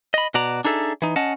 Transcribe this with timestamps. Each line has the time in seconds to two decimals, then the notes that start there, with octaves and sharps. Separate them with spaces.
0.14 D#5 B5
0.34 B2 F#4 D5 A#5
0.65 D4 D#4 G#4 A4 E5
1.02 E3 D#4
1.16 C#4 D#5 F#5 A5